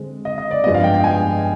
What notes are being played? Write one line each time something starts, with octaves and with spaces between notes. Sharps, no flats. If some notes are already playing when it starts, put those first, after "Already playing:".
Already playing: D3 G#3 C4
D#5
D#5
D5
G2 F3 G#3 B3 D#5
F5
G5
G5
G#5